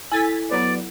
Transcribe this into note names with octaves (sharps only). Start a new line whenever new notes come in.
E4 A4 G#5 E6 A6 B6
F#3 B3 D5